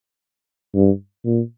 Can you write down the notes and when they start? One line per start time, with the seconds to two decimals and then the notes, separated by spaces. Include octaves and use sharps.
0.74 G2
1.25 A#2